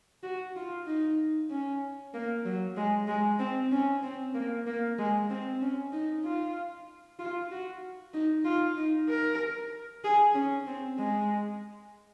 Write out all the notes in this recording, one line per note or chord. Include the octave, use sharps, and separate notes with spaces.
F#4
F4
D#4
C#4
A#3
F#3
G#3
G#3
C4
C#4
C4
A#3
A#3
G#3
C4
C#4
D#4
F4
F4
F#4
D#4
F4
D#4
A#4
G#4
C#4
C4
G#3